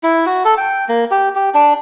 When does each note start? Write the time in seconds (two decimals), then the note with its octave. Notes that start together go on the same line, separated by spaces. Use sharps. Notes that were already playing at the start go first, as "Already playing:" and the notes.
0.03 E4
0.26 F#4
0.45 A4
0.57 G5
0.89 A#3
1.11 G4
1.35 G4
1.55 D4